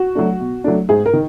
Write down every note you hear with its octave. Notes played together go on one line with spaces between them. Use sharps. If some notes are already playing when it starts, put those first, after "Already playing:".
Already playing: F#4
F#3 A3 D4
B2
F#3 A3 D4
G#2 G#4
A#4
D#3